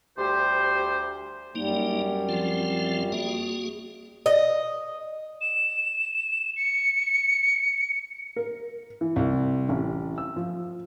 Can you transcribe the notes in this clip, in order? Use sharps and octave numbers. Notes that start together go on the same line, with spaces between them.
D2 G3 G4 C5
F#2 G3 A#3 D#4
F3 C4 F4
A#3 F#4 G#4
D#5
E7
C#7
A#4
E3
C2
A1
E6
F3